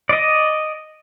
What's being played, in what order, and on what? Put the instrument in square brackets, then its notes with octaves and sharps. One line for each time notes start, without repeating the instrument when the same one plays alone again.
[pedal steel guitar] D5 D#5